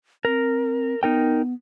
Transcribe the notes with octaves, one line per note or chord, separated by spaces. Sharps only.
C4 A#4
B3 D#4 A#4 G5